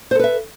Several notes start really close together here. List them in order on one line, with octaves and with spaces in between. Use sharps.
C5 A4 B4 E5